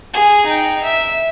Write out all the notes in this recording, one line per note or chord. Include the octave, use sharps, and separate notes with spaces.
G#4
D#4 G5
E5